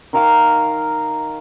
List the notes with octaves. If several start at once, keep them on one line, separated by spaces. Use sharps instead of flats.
D#3 D#4 A#4 F5